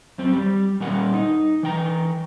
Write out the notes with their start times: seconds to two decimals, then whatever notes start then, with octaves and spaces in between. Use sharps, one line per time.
0.18 F#2 C4
0.33 G3
0.80 A#2 G3 A#4 F#5
1.14 D#4
1.63 E3 G5 A#5